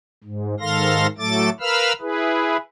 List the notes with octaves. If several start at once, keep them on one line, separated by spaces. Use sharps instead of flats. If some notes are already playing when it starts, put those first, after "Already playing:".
G#2
G#2 D#3 A4 F5 C6 A#6
A2 F#3 A3 A4 D6 A6
A#4 B4 F5 B5 E6 F6
E4 G#4 B4